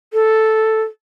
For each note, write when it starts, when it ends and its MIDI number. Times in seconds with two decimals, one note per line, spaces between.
0.13 0.82 69